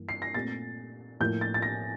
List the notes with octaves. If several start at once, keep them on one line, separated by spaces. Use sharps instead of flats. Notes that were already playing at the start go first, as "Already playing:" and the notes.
Already playing: G2 E3 A#3
C7
A#6
A#2 A3 C4 A6
A2 F3 A#3 G6
A6
A6
A#6